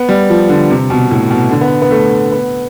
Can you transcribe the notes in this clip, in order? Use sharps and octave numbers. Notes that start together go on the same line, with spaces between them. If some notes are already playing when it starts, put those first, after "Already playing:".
Already playing: B3
G3
F3
D3
C3
B2
A2
B2
D3
B3
B3
A3
B3